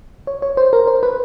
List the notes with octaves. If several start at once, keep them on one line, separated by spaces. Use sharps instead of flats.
C#5
C#5
C5
A#4
C5
B4